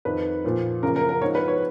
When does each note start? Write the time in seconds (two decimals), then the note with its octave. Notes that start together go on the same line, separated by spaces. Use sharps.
0.05 F2 D#3 B4
0.44 A#2 F3
0.83 F#2 C#3 F3 A#4
0.96 A#4
1.09 A#4
1.22 G#2 F3 C#5
1.35 B4
1.48 C#5